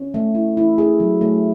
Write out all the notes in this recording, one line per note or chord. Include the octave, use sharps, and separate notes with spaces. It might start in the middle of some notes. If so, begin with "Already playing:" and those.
Already playing: C#4
A3
E4
E4
E4 G#4
F#3
A3